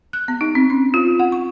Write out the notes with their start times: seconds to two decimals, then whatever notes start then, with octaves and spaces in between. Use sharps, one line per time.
0.13 F#6
0.28 B3
0.41 D#4
0.55 C4
0.70 C#4
0.94 F4
1.19 F#5
1.32 C#6